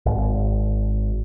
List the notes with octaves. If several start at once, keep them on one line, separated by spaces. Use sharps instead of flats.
G#1